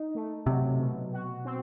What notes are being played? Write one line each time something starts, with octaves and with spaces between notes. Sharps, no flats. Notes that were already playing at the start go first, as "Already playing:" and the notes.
Already playing: D#4
A3
C3 F#3
B2
F#4
C4